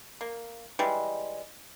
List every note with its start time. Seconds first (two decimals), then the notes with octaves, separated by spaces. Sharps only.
0.21 A#3
0.79 E3 G3 G#3